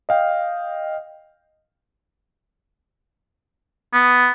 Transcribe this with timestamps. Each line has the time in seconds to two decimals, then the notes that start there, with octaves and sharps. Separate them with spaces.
0.09 D#5 F5 G5
3.93 B3